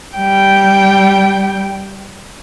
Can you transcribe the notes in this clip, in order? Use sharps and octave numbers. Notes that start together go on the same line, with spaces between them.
G3 G5